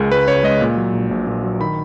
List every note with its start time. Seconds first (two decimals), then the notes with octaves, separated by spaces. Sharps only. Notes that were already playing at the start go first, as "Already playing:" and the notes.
Already playing: C#2 C#3 G#3 A#4
0.11 C#2 B4
0.28 C#3 C#5
0.43 G#3 D#5
0.61 A#2
0.77 F#3
0.93 A#1
1.11 A#1
1.27 A#2
1.43 F#3
1.60 D#3 B5